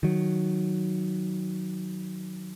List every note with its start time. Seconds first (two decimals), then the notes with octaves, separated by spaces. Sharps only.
0.03 D#3 F#3